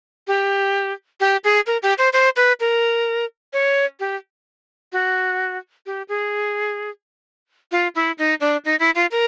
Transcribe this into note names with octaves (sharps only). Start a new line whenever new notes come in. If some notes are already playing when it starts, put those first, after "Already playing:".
G4
G4
G#4
A#4
G4
C5
C5
B4
A#4
C#5
G4
F#4
G4
G#4
F4
E4
D#4
D4
D#4
E4
F4
A#4